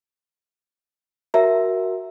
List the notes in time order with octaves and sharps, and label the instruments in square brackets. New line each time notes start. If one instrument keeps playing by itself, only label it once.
[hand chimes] F#4 A#4 [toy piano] E5 A#5